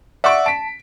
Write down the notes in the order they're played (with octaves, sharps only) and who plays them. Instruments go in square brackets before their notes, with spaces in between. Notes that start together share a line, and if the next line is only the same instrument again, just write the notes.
[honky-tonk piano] D5 C#6 D7 [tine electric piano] E5 F#5 E6
[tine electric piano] A5 [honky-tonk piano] B6 D7